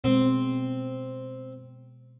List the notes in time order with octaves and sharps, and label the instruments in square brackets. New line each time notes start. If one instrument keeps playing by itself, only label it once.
[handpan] B2 G#3 [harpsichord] C4